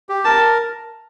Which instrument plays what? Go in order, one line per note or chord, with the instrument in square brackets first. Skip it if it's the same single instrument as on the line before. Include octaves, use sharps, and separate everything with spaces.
[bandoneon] G4
[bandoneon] A#4 [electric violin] A5